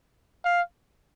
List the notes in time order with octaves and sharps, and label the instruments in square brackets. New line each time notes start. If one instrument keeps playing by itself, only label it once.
[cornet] F5